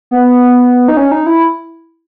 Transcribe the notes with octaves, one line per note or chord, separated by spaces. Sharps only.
B3
D#4
C#4
D#4
E4